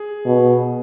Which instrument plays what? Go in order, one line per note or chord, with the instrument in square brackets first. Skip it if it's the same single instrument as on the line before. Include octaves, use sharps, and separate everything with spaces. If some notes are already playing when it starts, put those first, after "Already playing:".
Already playing: [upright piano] G#4
[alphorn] B2